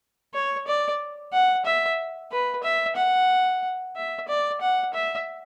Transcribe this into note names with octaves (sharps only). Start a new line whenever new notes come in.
C#5
D5
F#5
E5
B4
E5
F#5
E5
D5
F#5
E5